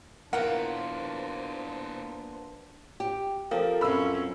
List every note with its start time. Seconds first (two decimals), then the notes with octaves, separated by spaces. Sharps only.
0.33 A#3 B3 D4 E4 F4 A#4 C5 F#5
3.00 G4
3.51 F3 C4 G4 A4 A#4 F5
3.81 F#2 C4 C#4 F4 B5 E6